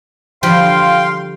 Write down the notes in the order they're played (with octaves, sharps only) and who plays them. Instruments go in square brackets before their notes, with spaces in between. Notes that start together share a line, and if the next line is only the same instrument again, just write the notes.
[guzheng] D3 F3 G3 [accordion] F5 C6 [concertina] G5